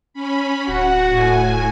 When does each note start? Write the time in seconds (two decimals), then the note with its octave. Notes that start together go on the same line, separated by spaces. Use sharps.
0.14 C#4 B5
0.68 D1 F#4 F#5
1.09 A2 G#5